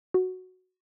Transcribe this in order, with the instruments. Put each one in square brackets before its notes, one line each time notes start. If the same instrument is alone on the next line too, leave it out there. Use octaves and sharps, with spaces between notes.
[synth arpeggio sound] F#4